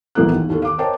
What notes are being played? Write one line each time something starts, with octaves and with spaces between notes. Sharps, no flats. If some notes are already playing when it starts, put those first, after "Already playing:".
E1 A#1 A#3 B3 A4 F#6
D#2
D#2 A4
F5 D6
A#4 C5 C#5 D#5 G5 A5